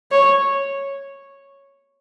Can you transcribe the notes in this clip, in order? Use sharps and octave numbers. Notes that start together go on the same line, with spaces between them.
C#5